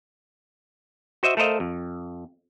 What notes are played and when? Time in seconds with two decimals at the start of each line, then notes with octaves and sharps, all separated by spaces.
1.23 F#4 C5 D#5 E5
1.37 A3 A4 A#4 C5 D#5 F5
1.60 F2